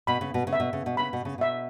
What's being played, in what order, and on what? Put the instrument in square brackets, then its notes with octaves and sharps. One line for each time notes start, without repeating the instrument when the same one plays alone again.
[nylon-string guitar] B2 [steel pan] B5
[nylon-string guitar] C#3
B2
C#3
[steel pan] E5
[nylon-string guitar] B2
C#3
B2
[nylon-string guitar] C#3 [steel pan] B5
[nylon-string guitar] B2
C#3
[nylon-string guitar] B2 [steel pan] E5